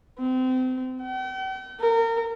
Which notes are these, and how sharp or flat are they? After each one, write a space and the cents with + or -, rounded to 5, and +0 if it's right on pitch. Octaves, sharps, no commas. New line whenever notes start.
C4 -30
G5 -45
A#4 -30